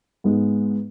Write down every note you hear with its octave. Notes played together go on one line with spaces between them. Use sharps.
G#2 G#3 B3